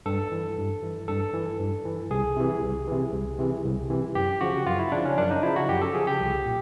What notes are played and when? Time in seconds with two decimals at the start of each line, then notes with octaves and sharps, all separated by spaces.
0.06 G2 A4
0.32 E3
0.58 G2
0.83 E3
1.08 G2 A4
1.34 E3
1.59 G2
1.85 E3
2.11 C2 G#4
2.37 C3 E3
2.62 C2
2.87 C3 E3
3.13 C2
3.39 C3 E3
3.64 C2
3.90 C3 E3
4.15 F#2 G4
4.41 C#3 F3 F#4
4.66 F#2 F4
4.79 E4
4.92 C#3 F3 D4
5.05 C#4
5.18 F#2 D4
5.31 D#4
5.43 C#3 F3 E4
5.56 F#4
5.69 F#2 G4
5.81 A4
5.94 C#3 F3 G#4
6.07 G4
6.20 C2
6.45 A#2